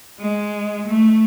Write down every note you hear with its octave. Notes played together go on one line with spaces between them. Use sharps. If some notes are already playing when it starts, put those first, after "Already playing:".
G#3
A3